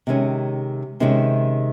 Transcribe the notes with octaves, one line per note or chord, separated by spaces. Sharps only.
C3 D#3 G#3 C#4
C3 D#3 G#3 C#4